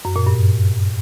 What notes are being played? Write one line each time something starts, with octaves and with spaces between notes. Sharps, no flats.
F#2
A#2
G2